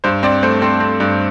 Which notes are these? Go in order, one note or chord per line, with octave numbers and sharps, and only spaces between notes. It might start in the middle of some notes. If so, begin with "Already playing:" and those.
G2 C5
C4 D5
A3 C5
C4 A4
C4
G2